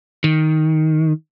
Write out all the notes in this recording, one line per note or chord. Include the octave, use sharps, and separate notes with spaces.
D#3